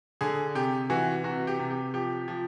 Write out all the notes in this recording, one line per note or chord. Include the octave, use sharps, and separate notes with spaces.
D3 G#4
C3 G4
E3 F#4
C3 F#4
G4
C3
G4
F3 G4
F3